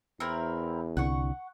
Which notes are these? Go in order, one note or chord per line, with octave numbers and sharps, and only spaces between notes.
E2 C4 E4 A#4
C2 D3 F#5 C#6